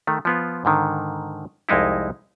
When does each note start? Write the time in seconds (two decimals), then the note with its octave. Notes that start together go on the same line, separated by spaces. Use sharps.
0.07 D#3 A3
0.25 F3 B3 F4
0.65 G#2 D3 D#3
1.69 C2 F2 G#3 D#4 E4